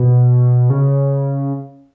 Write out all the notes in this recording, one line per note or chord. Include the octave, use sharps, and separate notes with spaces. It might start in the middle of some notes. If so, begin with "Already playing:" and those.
Already playing: B2
C#3